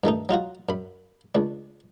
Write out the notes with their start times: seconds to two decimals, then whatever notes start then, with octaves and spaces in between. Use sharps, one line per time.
0.04 G2 D#3 A3 D#4
0.29 F#3 D#4 F4 F#4
0.69 F#2 B5
1.35 C#2 D4